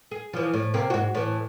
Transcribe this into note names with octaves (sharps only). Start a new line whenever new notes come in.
G#4
E3 F3
A2
C3 A#3 C4
G#2 F#4
A2 E3